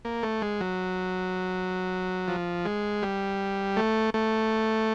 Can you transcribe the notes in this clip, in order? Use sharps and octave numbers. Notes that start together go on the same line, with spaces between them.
A#3
A3
G#3
F#3
F3
G#3
G3
A3
A3